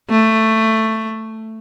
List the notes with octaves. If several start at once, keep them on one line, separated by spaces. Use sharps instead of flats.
A3